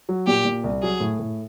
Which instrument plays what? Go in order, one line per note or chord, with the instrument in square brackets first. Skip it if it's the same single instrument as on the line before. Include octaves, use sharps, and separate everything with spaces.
[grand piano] F#3
[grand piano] A#2 [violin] G4
[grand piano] A#2
C2
[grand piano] F#3 [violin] G#4
[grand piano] A2
A2